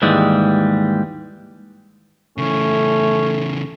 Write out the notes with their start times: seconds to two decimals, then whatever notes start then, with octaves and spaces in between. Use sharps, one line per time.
0.02 D#2 G#2 E3 G3 G#3
2.38 C#3 E3 A3 C#4